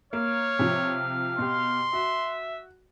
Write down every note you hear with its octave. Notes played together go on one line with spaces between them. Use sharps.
A#3 C#5 F5
C3 F3
B2 G4 C6
F#4 E5